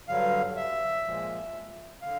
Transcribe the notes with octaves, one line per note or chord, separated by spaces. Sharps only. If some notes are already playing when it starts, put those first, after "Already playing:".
G2 D3 F#3 F5
E5
A#2 F3 G#3
D3 F5